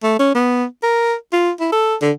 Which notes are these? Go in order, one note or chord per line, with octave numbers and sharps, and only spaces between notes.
A3
C#4
B3
A#4
F4
E4
A4
D3